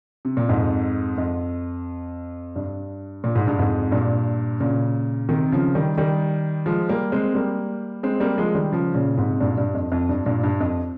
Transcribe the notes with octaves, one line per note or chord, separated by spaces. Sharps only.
C3
A#2
F2 G#2
F2
G2
A#2
G#2
G2
F2 G#2
G2 A#2
A#2 C#3
C3 D#3
C#3 F3
D#3 G3
D#3 G3
F3 G#3
G3 A#3
G#3 C4
G3 A#3
G#3 C4
G3 A#3
F3 G#3
D#3 G3
C#3 F3
A#2 C#3
G#2 C3
G2 A#2
G2
F2
F2
G2
G2 A#2
G2
F2